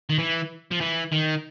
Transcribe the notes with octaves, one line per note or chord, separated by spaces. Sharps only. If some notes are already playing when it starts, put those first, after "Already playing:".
D#3
E3
F3
E3
D#3